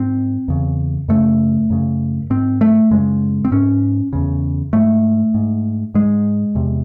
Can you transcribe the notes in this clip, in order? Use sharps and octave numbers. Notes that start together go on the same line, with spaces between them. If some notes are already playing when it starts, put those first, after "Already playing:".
Already playing: G#2 C4
E2 C#3
F#2 C#3 A3
F#2 C#3
G#2 C4
A3
F#2 C#3 G#3
C4
G#2 C#4
E2 C#3
G#2 A3
G#2
G#2 G#3
E2 C3